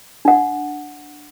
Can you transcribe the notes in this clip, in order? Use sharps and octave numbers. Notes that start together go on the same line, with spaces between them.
D4 F#5